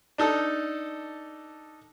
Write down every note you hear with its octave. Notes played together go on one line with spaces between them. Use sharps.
D4 D#4 A4